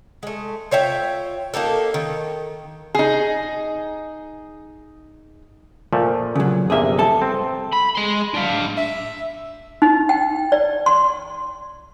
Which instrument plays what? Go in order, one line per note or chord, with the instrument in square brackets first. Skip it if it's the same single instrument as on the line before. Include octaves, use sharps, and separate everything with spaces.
[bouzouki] G#3 A3
F4 C#5 E5 G5
A#3 D#4 G4 A4
D#3
[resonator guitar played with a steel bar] D#4 G#4
[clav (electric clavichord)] A#2 F3 A3
[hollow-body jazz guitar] C#3 F#3
[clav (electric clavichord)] G1 C3 A#3 [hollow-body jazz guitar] G#4 E5
[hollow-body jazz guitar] G2 A4 A5
[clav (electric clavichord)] C4
[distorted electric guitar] B5
G#3 C6
D4 F5
[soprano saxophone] E5
[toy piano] D#4
G5
D5
C6